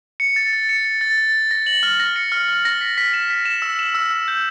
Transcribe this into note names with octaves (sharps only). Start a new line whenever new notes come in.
C#7
A6
A6
C#7
A6
A6
A6
A6
A#6
F#7
F6
A#6
C#7
F6
F6
A#6
B6
B6
E7
B6
E7
E6
E7
E6
E6
G6